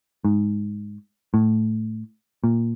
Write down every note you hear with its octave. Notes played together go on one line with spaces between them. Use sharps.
G#2
A2
A#2